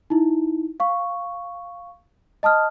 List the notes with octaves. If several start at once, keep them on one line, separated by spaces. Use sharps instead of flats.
D#4 E4
F5 C#6
D#5 A5 D#6 F6